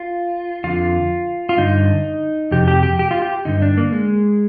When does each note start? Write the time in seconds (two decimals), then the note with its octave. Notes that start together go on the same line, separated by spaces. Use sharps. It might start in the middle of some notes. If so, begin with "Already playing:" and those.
Already playing: F4
0.64 F2 D3 F4
1.49 F4
1.57 G2 D3 D#4
2.51 F2 C3 G4
2.68 G4
2.83 G4
2.99 G4
3.11 F4
3.22 G4
3.45 G2 D3 D#4
3.62 D4
3.77 A#3
3.92 G#3